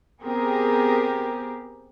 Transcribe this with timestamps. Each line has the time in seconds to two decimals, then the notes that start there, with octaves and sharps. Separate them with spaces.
0.22 B3 C4 G4 G#4 A#4